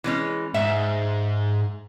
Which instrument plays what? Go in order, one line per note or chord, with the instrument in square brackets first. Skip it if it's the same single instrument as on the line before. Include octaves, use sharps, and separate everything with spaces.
[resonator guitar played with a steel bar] E3 G#3 C#4
[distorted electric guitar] G#2 [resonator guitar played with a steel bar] E5